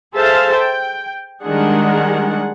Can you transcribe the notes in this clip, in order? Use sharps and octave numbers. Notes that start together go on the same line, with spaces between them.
G#4 A4 C5 E5 F5 A5
G5
D#3 G3 G#3 D4 G#4 F#5